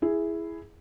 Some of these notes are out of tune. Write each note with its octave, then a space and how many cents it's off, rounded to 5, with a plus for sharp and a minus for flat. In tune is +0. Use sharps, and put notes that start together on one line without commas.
E4 +5 G#4 +0